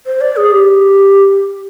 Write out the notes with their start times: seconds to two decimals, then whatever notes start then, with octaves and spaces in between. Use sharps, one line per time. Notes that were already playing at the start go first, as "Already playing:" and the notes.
0.06 C5
0.21 D5
0.36 G#4
0.52 G4